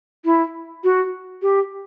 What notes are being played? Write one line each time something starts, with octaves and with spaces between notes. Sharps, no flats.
E4
F#4
G4